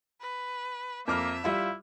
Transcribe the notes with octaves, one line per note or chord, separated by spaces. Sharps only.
B4
F2 A#3 E5 D6 F6
G3 E4 F4 F5